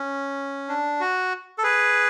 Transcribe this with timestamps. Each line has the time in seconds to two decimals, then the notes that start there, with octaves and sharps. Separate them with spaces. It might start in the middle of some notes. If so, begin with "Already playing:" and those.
Already playing: C#4
0.69 D4
1.00 F#4
1.58 A4
1.63 G#4 B4